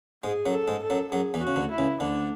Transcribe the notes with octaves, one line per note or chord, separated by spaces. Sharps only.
G#2 G#3 G#4
F#2 F#3
A4
G#2 G#3
A4
F#2 F#3
F#2 F#3 G#4
E2 E3
F#4
C#3
D2 D3
E4
C#2 C#3
D2 D3 D4